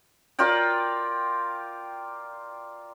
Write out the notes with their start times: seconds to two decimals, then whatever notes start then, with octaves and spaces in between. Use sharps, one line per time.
0.39 F4 A#4 D5 G5